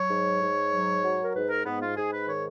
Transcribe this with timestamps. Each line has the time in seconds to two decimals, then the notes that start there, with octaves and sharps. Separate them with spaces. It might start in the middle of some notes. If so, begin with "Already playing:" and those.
Already playing: F#3 C#5
0.09 G#2
0.40 G#2
0.71 F#3
1.03 F#3
1.24 A#4
1.34 G#2 B4
1.50 A#4
1.65 G#2 B3
1.81 F4
1.96 G#2 G#4
2.12 B4
2.27 D#3 C#5